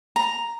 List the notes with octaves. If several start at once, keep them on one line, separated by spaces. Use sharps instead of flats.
A#5